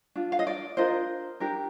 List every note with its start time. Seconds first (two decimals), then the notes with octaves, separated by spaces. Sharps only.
0.16 D4 F4
0.32 F5
0.39 D#5
0.47 D5
0.77 D4 F4 A#4 C5 D#5
1.40 D4 G4 A#4